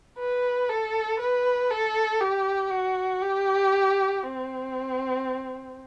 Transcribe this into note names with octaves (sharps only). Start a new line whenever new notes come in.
B4
A4
B4
A4
G4
F#4
G4
C4